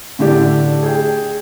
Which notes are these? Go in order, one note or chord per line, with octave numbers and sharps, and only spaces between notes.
A2 D3 D4 G4
G#4 G5